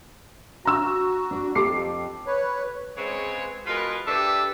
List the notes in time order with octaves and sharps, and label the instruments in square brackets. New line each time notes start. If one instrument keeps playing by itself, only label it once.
[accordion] F#4 [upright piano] A#5 E6
[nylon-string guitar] D4 D5
[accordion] F2 [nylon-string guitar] G4 A4 [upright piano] D6 C7
[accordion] B4 C#5
[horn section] C#3 G#3 C4 B4 C#5
B2 G#3 F4 A#4 B4
D4 G4 A4 B4 E5